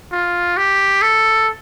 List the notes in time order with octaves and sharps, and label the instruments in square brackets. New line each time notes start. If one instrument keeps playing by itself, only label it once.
[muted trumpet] F4
G4
A4